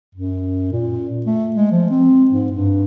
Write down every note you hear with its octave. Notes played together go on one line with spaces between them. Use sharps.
F#2
A#2
A3
G#3
F3
C4
G#2
G2